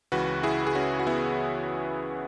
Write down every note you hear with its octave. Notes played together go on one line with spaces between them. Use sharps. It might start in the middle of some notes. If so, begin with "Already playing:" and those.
C#2 C#3 E3 F#4 B4
E4 G#4
G#4
C#4 F#4
F#4
B3 E4